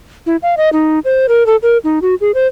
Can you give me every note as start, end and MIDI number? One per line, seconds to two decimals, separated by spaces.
0.26 0.36 64
0.43 0.55 77
0.57 0.70 75
0.73 0.99 63
1.05 1.26 72
1.29 1.46 70
1.46 1.56 69
1.63 1.78 70
1.84 1.99 63
2.02 2.15 66
2.21 2.31 68
2.34 2.47 72